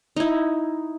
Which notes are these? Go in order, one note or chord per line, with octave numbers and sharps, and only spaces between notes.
D#4 E4